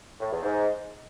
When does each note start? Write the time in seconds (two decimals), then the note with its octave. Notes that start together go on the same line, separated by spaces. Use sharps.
0.19 A2
0.31 E2
0.42 G#2